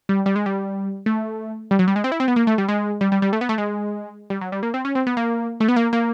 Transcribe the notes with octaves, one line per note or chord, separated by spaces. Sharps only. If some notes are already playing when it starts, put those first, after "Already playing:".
G3
G3
G#3
G3
A3
G3
F#3
G3
G#3
C4
E4
C4
B3
A#3
A3
G3
G#3
G3
G3
G3
A3
B3
A3
G#3
G3
F#3
G3
A#3
C4
C#4
C4
B3
A#3
A3
B3
A#3
A#3